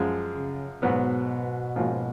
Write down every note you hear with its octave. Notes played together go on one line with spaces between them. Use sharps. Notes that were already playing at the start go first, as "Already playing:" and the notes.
Already playing: F#2 F3 G#3
C#3
G#2 B2 F#3 B3
G#2 F3 A#3 C#4 F#4